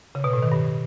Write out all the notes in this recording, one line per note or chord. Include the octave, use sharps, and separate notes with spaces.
C#3
B2
A2
D#3
G2